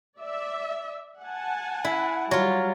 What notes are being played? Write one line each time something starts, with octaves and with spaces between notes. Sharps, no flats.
D5 E5
F#5 G#5 A5
E4
F#3 G3 F4